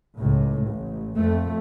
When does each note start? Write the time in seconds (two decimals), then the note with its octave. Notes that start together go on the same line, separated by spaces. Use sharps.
0.17 C#2 A2
0.66 A1
1.16 F2 A3